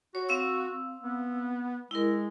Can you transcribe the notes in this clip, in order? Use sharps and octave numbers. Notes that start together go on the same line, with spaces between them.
F#4 C#5
C4 F5 E6
B3
G#3 E4 A#4